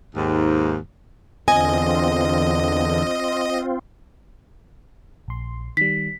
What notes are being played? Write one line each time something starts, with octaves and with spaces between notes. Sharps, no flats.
D#2 G#2
E2 D3 C4 F4 D#5 G#5
A#1 C6
D#3 G3 B6